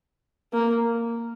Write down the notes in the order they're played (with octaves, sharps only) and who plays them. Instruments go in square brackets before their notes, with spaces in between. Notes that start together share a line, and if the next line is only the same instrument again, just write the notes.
[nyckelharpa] A#3